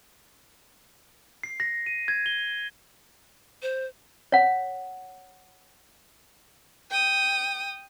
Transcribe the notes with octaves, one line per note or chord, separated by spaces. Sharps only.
C7
A#6
D#7
G#6
G7
C5
C#5 F#5
G5 D#6